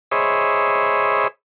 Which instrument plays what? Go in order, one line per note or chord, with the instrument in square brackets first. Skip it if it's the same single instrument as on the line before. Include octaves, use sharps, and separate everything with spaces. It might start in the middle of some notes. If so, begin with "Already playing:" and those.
[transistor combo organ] G#4 C5 C#5 D#5 E5 B5